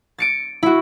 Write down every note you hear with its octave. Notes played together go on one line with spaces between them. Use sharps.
A6 C#7 D7
E4 F#4